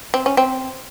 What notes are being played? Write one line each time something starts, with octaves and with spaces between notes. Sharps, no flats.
C4
C#4
C4